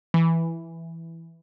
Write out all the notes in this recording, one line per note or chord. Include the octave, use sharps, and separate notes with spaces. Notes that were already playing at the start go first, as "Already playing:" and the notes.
E3